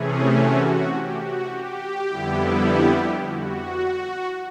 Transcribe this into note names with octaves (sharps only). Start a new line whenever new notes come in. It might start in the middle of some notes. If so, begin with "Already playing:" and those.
Already playing: C3 E3 A3 C#4 G#4
F#4
G4
F#4
G4
F2 D3 G3 B3 E4
F#4